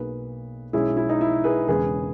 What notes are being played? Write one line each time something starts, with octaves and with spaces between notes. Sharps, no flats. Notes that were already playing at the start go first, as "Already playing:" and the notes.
Already playing: B1 B2 A#3 G#4 B4
B1 B2 G#3 C#4 E4 G#4
E4
D#4
E4
G#4 B4
E1 E2 C#3 G#3 B3 G#4 B4